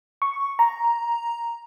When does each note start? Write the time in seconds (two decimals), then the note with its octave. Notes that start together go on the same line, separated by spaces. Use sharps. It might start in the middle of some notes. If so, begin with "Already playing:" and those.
0.22 C#6
0.59 A#5